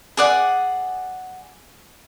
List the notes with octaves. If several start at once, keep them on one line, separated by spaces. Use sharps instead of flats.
G#4 D5 F#5